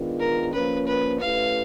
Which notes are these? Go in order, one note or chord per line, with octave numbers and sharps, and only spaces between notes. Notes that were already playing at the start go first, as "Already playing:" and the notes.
Already playing: D#3 G#3 B3 D4 F4
A#4
F3 A#3 C#4 B4
B4
A3 C#4 E4 G4 B4 F5